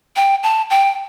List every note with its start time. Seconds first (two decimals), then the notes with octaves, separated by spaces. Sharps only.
0.16 G5
0.43 A5
0.70 G5